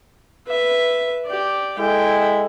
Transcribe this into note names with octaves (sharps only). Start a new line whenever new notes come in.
B4 E5
G4 D5
G#3 E4 A4 G5